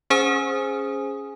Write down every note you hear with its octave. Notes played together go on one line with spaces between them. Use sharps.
C#4 G#4 C5 G#5 D#6